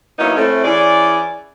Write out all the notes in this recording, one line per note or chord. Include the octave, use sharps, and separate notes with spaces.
F#3 A#3 B3 C#4 D#4 E4
A3 C4 C#4 E4
E3 C#4 G#4 D5